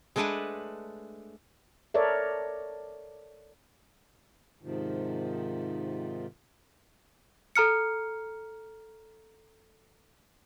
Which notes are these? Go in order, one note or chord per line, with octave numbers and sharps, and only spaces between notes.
G#3 A3 D4 B4 F#5 G#5
A4 A#4 C#5 D5 E5
G#2 C3 D#3 F3
A4 A#5 F6 C#7